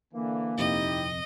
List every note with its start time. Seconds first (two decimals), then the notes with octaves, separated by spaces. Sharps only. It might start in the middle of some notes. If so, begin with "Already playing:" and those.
0.14 D3 E3 A#3
0.58 D#1 F2 C3 D#4 E4 G4 D#5